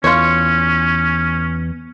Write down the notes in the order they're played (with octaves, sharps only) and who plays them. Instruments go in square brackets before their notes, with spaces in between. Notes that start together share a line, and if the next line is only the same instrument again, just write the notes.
[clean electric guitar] E2 [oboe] C#4 [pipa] F4 C#5